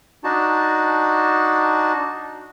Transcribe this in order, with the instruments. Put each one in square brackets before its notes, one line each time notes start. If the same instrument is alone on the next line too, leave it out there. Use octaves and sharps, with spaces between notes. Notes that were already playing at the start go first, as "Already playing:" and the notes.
[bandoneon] D4 D#4 F#4 A5